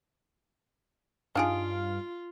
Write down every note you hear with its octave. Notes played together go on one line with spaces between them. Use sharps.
G2 D4 D#4 F4 G#4 F5 D7